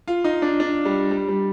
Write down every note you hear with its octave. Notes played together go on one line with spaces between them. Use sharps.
F4
D#4
D4
D4
G3
G3
G3